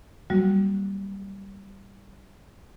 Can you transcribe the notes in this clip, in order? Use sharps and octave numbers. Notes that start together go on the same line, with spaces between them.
F#3 G3 A#3 F#4